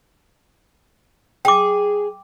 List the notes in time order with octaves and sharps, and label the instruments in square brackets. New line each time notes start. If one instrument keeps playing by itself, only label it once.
[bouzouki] G#4 [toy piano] G5 D6